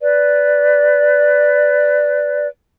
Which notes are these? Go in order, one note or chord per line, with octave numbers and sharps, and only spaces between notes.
B4 D5